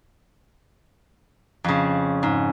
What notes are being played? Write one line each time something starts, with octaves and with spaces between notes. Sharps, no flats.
F2 C#3
G#2